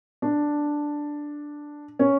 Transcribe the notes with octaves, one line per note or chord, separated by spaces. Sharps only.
D4
C#4